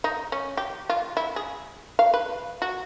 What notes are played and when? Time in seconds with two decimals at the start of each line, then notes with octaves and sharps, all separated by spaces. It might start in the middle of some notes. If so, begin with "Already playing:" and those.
0.04 D#4
0.32 C#4
0.57 G4
0.89 F4
1.17 E4
1.36 G#4
1.99 F5
2.14 B4
2.62 F#4